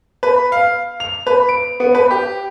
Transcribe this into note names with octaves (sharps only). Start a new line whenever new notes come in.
B4
F5
F7
B4
D7
B3
B4
G4